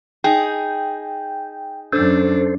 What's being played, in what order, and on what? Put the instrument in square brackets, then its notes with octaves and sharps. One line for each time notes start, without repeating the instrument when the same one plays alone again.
[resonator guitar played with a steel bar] D#4 G#4 [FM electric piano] G5
[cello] F#2 D4 [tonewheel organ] A4 C5